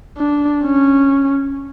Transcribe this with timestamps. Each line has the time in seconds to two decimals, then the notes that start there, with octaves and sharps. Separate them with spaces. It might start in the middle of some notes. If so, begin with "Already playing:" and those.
0.18 D4
0.64 C#4